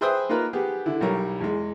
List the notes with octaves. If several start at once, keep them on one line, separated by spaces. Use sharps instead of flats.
G#4 B4 C5 E5 G5 D#6
A#3 D#4 F4 A#4 B4
B3 G4 G#4
D3 E4
B1 G3 A#4 C#5
E2 G#3